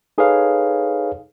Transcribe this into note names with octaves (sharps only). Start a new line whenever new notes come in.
D#4 G#4 A4 B4 C#5 F5